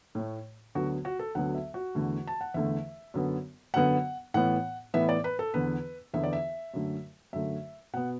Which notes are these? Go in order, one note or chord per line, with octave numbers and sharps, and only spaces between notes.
A2 A3
D2 D3 F#3 B3 F#4
F#4
A4
D2 D3 F#3 B3 F#5
E5
F#4
E2 D3 A3
A5
F#5
E2 D3 A3 E5
F#2 D3 B3
F#2 D3 B3 F#5
A2 E3 B3 F#5
A2 E3 B3 E5
D5
B4
A4
E2 D3 B3 B4
E2 D3 B3 E5
D5
E5
F#2 D3 A3
F#2 D3 A3 E5
B2 B3 F#5